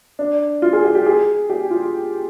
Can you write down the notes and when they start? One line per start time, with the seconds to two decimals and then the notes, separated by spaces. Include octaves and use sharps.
0.19 D4
0.62 F4
0.73 G#4
0.84 G4
0.95 G4
1.06 G#4
1.50 G4
1.70 F4